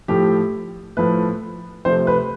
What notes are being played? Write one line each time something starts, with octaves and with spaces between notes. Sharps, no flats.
A2 F3 A3 G4
A2 F3 A3 B4
C3 F3 A3 C5
B4